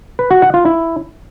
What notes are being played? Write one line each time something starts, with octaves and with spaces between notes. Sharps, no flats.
B4
F#4
F#5
F4
E4